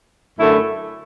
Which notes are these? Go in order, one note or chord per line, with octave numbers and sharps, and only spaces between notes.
F#2 D3 A3 E4